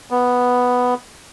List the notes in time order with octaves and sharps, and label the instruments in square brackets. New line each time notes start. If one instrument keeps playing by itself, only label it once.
[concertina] B3